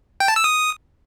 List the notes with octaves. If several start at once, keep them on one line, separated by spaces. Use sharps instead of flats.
G5
A5
E6
D#6